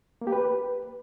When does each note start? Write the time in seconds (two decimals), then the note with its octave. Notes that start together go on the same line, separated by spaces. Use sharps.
0.21 A#3
0.27 G4
0.32 B4